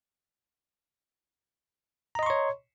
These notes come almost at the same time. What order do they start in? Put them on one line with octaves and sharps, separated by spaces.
A#5 D#5 C6 C#6 C#5